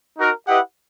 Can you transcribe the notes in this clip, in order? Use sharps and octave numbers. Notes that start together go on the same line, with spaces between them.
D#4 F#4 A#4
E4 G4 B4 D#5 F#5